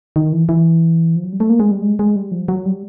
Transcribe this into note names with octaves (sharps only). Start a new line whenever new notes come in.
D#3
E3
E3
F3
F#3
G3
A3
A#3
G#3
G3
G#3
G#3
G3
F3
F#3
G3